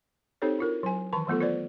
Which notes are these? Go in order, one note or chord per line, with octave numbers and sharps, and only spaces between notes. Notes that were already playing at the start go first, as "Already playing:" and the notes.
C4 D#4 G4 A4 C5 C#5
E4 F4 A#4
F#3 G#5
D#3 E3 A5 C#6
F#3 A3 B3 F4 A4
F4 B4 C5 D5